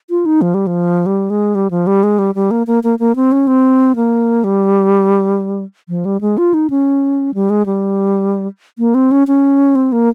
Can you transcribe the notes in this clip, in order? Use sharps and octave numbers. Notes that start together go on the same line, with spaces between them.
F4
D#4
F3
G3
F3
G3
G#3
G3
F3
G3
G#3
G3
G3
A#3
A#3
A#3
A#3
C4
C#4
C4
A#3
G3
F3
G3
G#3
F4
D#4
C#4
G3
G#3
G3
A#3
C4
C#4
C#4
C4
A#3